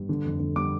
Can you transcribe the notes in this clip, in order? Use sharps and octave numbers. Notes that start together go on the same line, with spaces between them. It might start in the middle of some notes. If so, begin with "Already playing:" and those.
Already playing: G2
D3
F2
D3
G3 D6